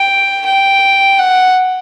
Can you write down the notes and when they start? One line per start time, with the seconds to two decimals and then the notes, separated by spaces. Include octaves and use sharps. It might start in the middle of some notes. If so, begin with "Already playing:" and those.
Already playing: G5
0.46 G5
1.19 F#5